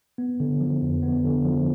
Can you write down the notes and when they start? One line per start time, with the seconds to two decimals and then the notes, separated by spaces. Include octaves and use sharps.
0.18 B3
0.40 D3
0.61 F3
0.82 F2
1.03 B3
1.25 D3
1.45 F3